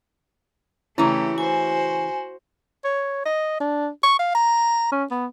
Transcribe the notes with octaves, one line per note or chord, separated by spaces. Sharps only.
C#3 E3 A3 C#4 E4 G4 A#5
F#4 C5 G#5
C#5
D#5
D4
C#6
F5
A#5
C#4
B3